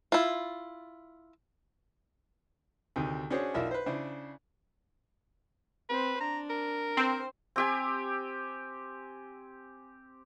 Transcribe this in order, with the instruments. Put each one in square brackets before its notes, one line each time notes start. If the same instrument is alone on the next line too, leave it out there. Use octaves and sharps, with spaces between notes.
[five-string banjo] E4 F4
[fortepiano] D2 C3 D#3
C#4 D4 F#4 G#4 C5 C#5
B1 E4 F4 A#4 D5 E5
B4 C5
C#3 D4 E4 C5
[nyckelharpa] C4 C5 [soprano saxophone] B4
[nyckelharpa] D4 [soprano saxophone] A#5
[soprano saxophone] A#4
[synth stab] C4 [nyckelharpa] C5
[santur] C4 G4 G#5